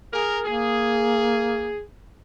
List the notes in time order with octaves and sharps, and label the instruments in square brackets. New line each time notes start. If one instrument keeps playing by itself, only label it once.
[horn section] G#4 A#4
[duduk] A#3 [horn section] G#4